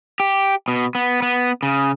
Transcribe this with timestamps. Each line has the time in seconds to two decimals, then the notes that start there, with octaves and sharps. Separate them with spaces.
0.20 G4
0.68 B2
0.95 B3
1.22 B3
1.63 C#3